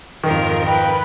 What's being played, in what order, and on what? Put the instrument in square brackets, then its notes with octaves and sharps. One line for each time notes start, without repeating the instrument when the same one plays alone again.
[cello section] F2 G#2 A#4 [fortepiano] D#3 [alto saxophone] F4
[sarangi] B4 [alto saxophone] G5